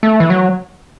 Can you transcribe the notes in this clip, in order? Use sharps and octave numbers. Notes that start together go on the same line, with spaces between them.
A3
E3
F#3